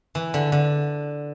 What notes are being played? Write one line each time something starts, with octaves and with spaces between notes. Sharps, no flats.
E3
D3
D3